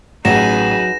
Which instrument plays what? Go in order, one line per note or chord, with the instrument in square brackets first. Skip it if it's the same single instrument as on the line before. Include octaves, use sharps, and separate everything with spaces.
[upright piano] A1 F#4 [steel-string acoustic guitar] F#3 [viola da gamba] D#4 G#4 B4 [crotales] A#6 E7